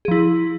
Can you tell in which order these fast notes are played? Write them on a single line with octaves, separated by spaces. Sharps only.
G#4 F3 E4